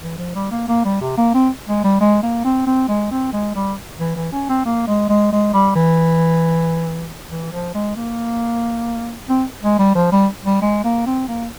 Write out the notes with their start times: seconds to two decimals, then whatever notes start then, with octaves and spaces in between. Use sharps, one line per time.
0.01 E3
0.18 F3
0.35 G3
0.51 A#3
0.68 A#3
0.85 G3
1.01 C3
1.17 A#3
1.34 C4
1.67 G#3
1.84 G3
2.00 G#3
2.23 A#3
2.44 C4
2.66 C4
2.88 G#3
3.11 C4
3.33 G#3
3.55 G3
3.99 E3
4.16 E3
4.32 C#4
4.49 C4
4.65 A#3
4.87 G#3
5.09 G#3
5.32 G#3
5.53 G3
5.75 E3
7.30 E3
7.52 F3
7.75 G#3
7.96 A#3
9.29 C4
9.63 G#3
9.79 G3
9.95 F3
10.12 G3
10.45 G3
10.62 G#3
10.84 A#3
11.06 C4
11.28 A#3